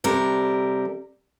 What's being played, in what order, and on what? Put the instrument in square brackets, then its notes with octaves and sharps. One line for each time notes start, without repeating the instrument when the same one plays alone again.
[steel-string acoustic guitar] C3 G3 A4 A#4